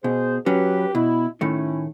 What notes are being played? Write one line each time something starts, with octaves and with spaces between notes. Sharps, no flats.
B2 G#4 C5
F#3 C#4 G4 B4
B2 E4
A2 D#3 A3 C#4 E4